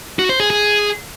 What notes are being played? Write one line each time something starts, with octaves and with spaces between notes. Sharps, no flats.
F#4
C5
G#4
G#4